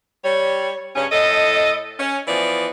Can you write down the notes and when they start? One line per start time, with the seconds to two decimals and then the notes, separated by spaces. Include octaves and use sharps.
0.25 G3 C#5
0.96 G2 C#3 C#4
1.12 A2 A4 D#5
1.99 C#4
2.28 E3 F3 B3 D5